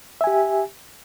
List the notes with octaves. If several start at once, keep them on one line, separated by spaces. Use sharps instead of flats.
G4 E5 G#5